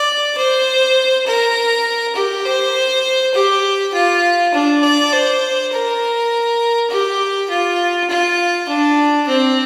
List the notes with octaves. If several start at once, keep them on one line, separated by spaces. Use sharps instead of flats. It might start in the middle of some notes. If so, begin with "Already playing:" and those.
Already playing: D5
C5
A#4
G4
C5
G4
F4
D4
D5
C5
A#4
G4
F4
F4
D4
C4